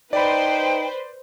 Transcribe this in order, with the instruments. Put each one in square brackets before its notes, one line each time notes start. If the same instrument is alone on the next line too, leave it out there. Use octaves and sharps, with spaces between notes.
[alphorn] D#4 [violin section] B4 C5 [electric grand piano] D5 B5 [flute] G5